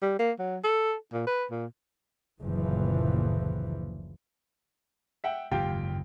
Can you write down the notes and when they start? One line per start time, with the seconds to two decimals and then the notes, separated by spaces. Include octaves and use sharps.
0.02 G3
0.19 A#3
0.39 F#3
0.64 A4
1.13 A#2
1.27 B4
1.51 A#2
2.41 F#1 D2 A#2 E3 F3
5.24 E5 F#5 G5
5.51 F#1 D#2 G#2 F4 G4 G5